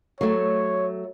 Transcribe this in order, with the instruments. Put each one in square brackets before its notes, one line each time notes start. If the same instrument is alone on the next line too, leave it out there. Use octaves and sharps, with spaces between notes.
[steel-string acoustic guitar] F#3 A3 [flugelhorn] C#5